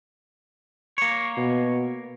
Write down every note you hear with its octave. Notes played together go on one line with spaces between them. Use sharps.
A#3 C#5
B2